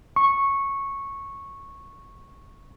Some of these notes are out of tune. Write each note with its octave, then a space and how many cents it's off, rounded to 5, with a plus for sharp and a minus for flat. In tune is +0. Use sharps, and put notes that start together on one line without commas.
C#6 -10